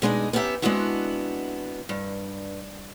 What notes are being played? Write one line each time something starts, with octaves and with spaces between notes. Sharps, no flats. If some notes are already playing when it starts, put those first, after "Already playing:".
B2 G#3 D4 D#4
B3 C#4 D#4 G4 E5
G#3 B3 C4 D4 E4 F#4
G2